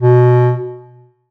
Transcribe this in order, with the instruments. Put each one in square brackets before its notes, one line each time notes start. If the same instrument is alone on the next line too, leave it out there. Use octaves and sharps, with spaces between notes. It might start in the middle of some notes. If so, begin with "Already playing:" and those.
[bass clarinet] B2